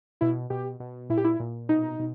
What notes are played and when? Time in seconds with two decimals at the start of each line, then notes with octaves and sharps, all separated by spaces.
0.21 B2 E4
0.50 B2 G4
0.80 B2
1.09 A#2 E4
1.17 G4
1.24 E4
1.40 A#2
1.69 B2 D#4
2.00 B2